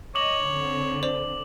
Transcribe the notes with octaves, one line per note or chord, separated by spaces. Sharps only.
C#5 D#5 D6 F#7
D3 C4
C5 D5 F7